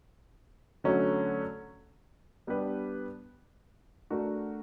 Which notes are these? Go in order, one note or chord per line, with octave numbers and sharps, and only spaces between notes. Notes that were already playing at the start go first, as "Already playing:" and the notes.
D3 F#3 A3 C#4 F#4
G3 B3 D4 G4 B4
A3 D4 F#4 A#4